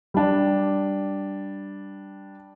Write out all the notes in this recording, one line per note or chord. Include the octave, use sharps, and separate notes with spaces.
G3 D4